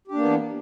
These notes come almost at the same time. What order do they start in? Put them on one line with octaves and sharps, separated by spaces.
G4 D4 A#3 B3 E3